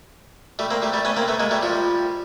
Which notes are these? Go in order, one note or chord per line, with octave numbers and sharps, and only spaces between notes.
G3 A3
A#3 C4
G3 A3
G3 A3
B3 C#4
A#3 C4
A3 B3
G#3 A#3
G3 A3
F3 G3